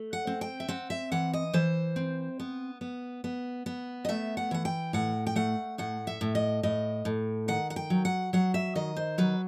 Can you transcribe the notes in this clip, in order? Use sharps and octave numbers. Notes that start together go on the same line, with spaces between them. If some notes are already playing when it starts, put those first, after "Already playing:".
Already playing: A3
F#5
C4
G5
E5
C4 F#5
E5
E3 F#5
D#5
E3 C5
C4
B3
B3
B3
B3
D#5
A3 E5
F#5
E3 F#5
G5
A2 F#5
G5
A3 F#5
A2 F#5
E5
A2
D#5
A2 D#5
A2
D#3 F#5
F#5
G5
F#3
F#5
F#3 F#5
E5
D#3 D#5
C5
F#3 B4